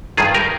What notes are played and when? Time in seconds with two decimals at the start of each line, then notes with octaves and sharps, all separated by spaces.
0.17 G2 D#3 F4 G#4
0.34 G4 A#4